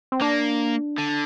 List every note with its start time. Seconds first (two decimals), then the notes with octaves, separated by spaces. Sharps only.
0.12 C4
0.21 A#3 D4
0.98 D3